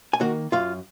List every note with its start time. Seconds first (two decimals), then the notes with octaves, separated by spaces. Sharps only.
0.13 G#5
0.21 D#3 A#3 F#4 F#5
0.52 F#2 F4 F5